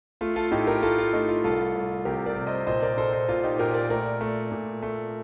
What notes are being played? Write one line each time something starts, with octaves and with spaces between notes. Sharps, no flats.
A3 F4
F4 A4
A2 D#4 G4
G4 A#4
A3 F4 A4
F4
A3 D#4
F4
C2 F4 A4
C2
C3 G4 A#4
A#4 D5
C3
C5 D#5
A#2 C5 D#5
A#4 D5
A#2 A4 C5
C5 D#5
A#2 F4
D#4 G4
A#2 G4 A#4
A#4 D5
A3 A#4 D5
A3
A#2
A3